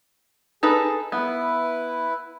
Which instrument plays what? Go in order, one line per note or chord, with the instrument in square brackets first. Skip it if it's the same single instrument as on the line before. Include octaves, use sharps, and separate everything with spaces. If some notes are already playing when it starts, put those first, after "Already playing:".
[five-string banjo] D#4 A4 B4 [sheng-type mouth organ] G#4
[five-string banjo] B3 [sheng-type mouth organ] E4 B4